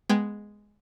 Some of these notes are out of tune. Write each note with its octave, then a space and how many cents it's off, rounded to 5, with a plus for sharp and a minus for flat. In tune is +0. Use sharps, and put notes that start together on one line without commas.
G#3 +0 B3 +0 G5 +0